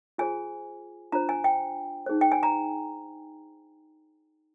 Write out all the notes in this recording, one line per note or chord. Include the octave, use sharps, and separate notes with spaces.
F4 G#4 C5 G#5
D4 F4 C5 A#5
G#5
G5
D#4 G#4 C5
G5
G#5
A#5